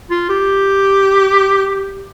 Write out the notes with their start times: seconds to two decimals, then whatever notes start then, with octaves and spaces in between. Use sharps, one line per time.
0.11 F4
0.29 G4